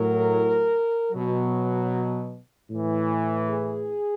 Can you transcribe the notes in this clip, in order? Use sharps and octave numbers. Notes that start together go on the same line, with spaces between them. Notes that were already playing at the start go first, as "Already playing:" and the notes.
Already playing: A2 F#3 A#4
B2 F#3
A2 E3
G#4